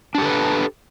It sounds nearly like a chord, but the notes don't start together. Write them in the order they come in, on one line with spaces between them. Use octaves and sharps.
D4 G4 A4 B4